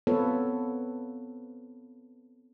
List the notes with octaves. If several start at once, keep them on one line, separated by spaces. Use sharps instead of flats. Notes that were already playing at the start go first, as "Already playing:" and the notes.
B3 C4 F4 A4 B4 C#5